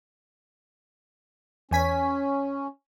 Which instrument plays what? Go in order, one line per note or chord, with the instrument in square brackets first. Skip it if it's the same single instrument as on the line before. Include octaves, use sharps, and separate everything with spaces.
[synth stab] E2 G#5 B6 [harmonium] C#4